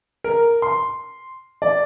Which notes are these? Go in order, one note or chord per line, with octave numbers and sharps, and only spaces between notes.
A#4
C6
D5